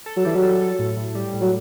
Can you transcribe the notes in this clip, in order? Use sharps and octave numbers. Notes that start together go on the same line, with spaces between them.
A4
F#3
E3 G3
F#3
A4
A4
A2
A2
G3
A2
F#3